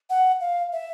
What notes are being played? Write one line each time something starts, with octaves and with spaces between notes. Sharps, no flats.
F#5
F5
E5